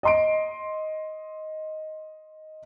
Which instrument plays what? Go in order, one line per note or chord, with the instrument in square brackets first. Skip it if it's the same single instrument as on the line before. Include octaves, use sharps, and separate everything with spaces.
[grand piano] D#5 C6 D7